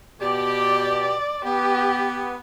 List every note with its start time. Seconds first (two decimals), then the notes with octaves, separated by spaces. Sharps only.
0.21 B2 G4 D5
1.44 B3 G4